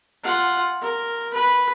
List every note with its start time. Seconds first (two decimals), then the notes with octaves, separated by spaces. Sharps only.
0.23 F4 F#5
0.81 A#4
1.33 B4